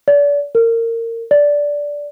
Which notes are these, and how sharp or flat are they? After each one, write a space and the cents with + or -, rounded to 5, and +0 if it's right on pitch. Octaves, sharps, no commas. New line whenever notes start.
D5 -35
A#4 -25
D5 -10